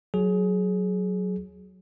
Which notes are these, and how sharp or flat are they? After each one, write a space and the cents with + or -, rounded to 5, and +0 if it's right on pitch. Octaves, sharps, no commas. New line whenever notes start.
F#3 +0 G#4 +20